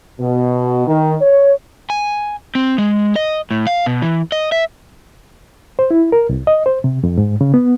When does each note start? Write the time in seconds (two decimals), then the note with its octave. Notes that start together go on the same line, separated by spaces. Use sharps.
0.19 B2
0.87 D#3
1.22 C#5
1.90 G#5
2.55 C4
2.78 G#3
3.16 D#5
3.51 A2
3.67 F5
3.86 B2
4.02 E3
4.32 D#5
4.52 E5
5.79 C5
5.91 E4
6.12 A#4
6.29 C2
6.47 D#5
6.66 C5
6.84 C3
7.04 F2
7.18 G#2
7.41 C#3
7.54 B3